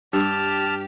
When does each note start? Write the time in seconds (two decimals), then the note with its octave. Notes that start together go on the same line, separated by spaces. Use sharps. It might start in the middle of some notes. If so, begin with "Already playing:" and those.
0.13 G2 G4 A5 F6